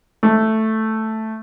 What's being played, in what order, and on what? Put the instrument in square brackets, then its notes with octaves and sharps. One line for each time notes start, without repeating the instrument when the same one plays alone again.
[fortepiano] A3